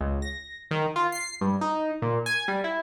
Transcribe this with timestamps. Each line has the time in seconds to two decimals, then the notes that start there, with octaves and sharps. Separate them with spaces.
0.01 C#2
0.22 A#6
0.71 D#3
0.96 F4
1.12 C7
1.41 G2
1.61 D#4
2.02 A#2
2.26 G#5
2.48 G3
2.64 E4